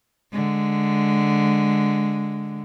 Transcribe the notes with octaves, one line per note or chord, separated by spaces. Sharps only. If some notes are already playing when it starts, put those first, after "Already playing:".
D3 G#3